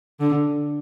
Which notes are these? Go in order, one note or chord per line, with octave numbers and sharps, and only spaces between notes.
D3